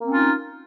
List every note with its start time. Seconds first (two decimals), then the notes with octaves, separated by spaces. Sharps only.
0.01 A#3
0.04 C4
0.08 C#4
0.12 F4
0.16 D#4